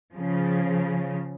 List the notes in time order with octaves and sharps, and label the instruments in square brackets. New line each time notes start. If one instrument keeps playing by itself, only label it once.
[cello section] C#3 F3